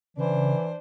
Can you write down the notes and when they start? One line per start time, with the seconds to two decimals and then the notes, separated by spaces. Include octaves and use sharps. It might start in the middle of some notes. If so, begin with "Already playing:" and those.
0.17 C#3 E3 D4 C5